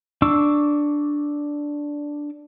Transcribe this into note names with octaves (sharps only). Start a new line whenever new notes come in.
D4 C#6 D6 E6